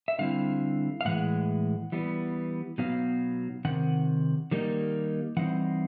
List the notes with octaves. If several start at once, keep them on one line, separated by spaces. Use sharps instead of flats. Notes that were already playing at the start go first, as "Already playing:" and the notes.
E5
D3 G3 C4 E4 F5
F5
A2 E3 G#3 F#5
E3 G3 B3
B2 F#3 B3 D#4 F5
C3 D#3 F#5
D#3 G3 A#3 D#4
E3 G3 C4 D#4 F#5